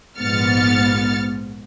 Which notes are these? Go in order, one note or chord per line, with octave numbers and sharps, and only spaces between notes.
A#1 G#2 B3 F6 A6 C#7